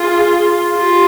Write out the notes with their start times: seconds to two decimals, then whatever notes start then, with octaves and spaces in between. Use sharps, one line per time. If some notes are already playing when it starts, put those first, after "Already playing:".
Already playing: F4 G#4
0.76 F4 G4